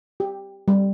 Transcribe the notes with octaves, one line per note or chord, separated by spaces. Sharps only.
G4
G3